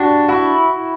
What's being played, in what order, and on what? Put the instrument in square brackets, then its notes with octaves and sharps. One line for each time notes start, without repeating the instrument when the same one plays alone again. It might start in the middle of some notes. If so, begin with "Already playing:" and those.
Already playing: [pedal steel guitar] D4 [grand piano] F#4 G4
[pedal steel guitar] E4 [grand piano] F#4